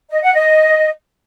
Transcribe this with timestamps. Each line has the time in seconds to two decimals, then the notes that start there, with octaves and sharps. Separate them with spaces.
0.10 D#5
0.21 F#5
0.33 D#5